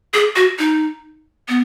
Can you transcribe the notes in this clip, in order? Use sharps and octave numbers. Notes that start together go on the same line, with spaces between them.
G#4
F#4
D#4
B3